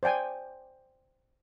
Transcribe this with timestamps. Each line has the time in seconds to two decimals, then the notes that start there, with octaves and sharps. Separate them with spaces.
0.03 C5 D5 G5 G#5